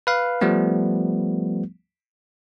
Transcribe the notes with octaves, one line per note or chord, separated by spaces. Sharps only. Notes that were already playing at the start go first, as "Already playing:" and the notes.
B4 F5
F3 G3 A3 B3